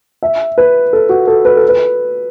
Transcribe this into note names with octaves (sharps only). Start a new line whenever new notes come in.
E5
B4
A4
F#4
A4
B4
A4
B4